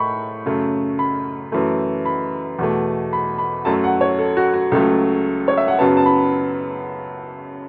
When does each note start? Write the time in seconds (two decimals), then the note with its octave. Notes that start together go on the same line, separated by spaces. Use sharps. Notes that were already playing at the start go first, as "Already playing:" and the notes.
Already playing: A2 A3 B5 C#6
0.46 F#2 C#3 A3
0.99 B5
1.52 F#2 E3 A3
2.06 B5
2.59 E2 B2 A3
3.13 B5
3.38 B5
3.65 F#2 F#3 A3 A5
3.84 F#5
4.01 C#5
4.19 A4
4.37 F#4
4.54 F#4
4.72 C#2 C#3 F#3 A3 A4
5.48 C#5
5.57 E5
5.68 F#5
5.78 F#2 C#3 F#3 B3 A5
5.97 A5
6.06 B5